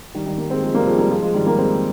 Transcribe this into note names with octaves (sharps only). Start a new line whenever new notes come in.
D#3 G3
D#3 G3
G3 A#3
G#3 C4
F3 G#3
G3 A#3
F3 G#3
G3 A#3
F3 G#3
F3 G#3
D#3 G3
G3 A#3
G#3 C4